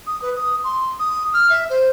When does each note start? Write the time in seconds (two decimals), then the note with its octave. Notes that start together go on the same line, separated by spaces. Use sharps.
0.07 D#6
0.22 B4
0.36 D#6
0.64 C6
0.99 D#6
1.33 F6
1.50 E5
1.70 C5